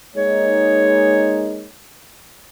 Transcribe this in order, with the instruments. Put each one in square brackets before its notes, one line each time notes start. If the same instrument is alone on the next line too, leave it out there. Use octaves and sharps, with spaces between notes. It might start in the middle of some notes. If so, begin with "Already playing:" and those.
[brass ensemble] G#3 A#3 D#4 [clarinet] C#5